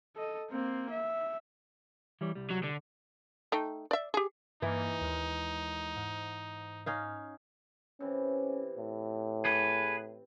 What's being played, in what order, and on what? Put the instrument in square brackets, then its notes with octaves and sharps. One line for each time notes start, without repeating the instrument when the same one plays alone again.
[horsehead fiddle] A4 D#5
A#3 C4
E5
[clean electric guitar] E3 G3 C#5
C2 G3
[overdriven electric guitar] F#3
D3
[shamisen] A3 D#4 G5
D5 E5
G4 G#4
[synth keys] G2 A#3 [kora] E3 [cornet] D#4
[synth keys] D#2 G#3
G#2
[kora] C#4 D#4 F5
[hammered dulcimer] C3 E3 [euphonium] C#4
[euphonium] A2
[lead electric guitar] G#4 B4